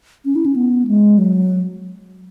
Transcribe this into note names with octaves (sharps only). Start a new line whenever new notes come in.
C#4
E4
C#4
B3
G#3
F#3